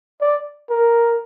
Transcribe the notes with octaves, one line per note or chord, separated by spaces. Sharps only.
D5
A#4